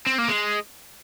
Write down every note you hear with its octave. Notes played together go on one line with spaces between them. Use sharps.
C4
A#3
G#3